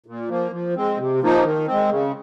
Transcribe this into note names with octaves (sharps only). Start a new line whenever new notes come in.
A#2
F3 A#3
F3
G#3 C4
C3
F3 A#3 D#4
D#3
G#3 C4
C#3